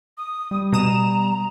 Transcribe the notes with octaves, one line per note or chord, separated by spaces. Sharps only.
D#6
G3
B2 A#5 D#6 E7